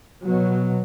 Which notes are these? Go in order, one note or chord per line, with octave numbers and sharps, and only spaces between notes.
B2 F#3